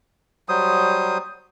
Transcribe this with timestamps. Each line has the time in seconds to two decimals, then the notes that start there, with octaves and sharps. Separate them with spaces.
0.49 F#3 G3 C5 D#6